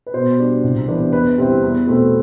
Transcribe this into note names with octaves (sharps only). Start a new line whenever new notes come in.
B4
B2 C5
G3 D4
C2
C3 E3 B3 D4
E2 B4
C3 G3 C4 E4
E2
B2 A3 C4